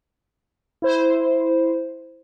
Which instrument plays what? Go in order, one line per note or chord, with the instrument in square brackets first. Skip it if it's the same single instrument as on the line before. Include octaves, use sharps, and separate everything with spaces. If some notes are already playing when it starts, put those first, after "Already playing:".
[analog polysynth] E4 C5